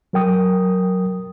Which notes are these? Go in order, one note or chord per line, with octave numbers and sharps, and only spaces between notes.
F#3 A#4 G5 D#6